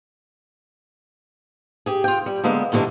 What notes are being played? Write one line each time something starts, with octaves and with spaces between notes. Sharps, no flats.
G4 G#4
F4 G5
G3
D3 G#3 A#3 B3
G2 A#2 D3 E3 G#3